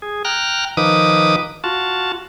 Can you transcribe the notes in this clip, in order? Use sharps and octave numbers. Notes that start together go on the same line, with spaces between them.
G#4
G5 A#5 F6 F#6
D#3 F3 D#4 B4 D6 D#6
F4 F#4 A5